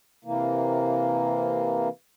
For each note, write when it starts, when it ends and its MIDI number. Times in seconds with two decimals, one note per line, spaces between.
0.25 1.89 48
0.25 1.89 52
0.25 1.89 58